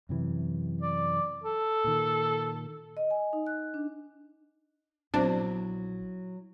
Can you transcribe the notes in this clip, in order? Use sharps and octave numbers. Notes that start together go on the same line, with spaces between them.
F#2 C3 E3
D5
A4
A#2 D#3
D#5
G#5
D#4
F#6
D4
A#1 F#3 B3 C4 D4 E4 C5